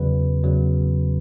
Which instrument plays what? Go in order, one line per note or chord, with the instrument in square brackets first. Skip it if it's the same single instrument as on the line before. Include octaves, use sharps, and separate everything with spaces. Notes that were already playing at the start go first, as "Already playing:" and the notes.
Already playing: [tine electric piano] E2 C#3 F#3 B4
E2 C#3 F#3